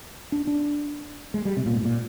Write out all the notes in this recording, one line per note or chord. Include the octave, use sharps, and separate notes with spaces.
D4
D4
G#3
G3
C3
A#2
G#2
A#2